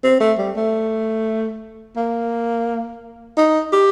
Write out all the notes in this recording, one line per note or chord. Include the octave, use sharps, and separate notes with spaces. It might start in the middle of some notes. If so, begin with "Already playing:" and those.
C4
A3
G3
A3
A#3
D#4
G4